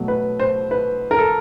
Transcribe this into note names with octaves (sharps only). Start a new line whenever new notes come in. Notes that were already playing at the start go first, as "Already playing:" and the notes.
Already playing: B2 F#3 A3
B4
C5
B4
A#4
A4